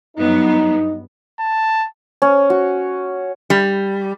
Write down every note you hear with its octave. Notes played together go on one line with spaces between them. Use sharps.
G2 F#3 B3 D#4
A5
C#4
F#4
G3